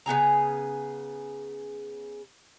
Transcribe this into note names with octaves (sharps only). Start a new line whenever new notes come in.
C#3 B3 G#4 A#5